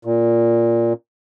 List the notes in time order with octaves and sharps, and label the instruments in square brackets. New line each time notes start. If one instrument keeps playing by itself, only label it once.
[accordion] A#2